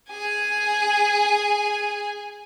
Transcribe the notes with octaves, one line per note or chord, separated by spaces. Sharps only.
G#4 G#5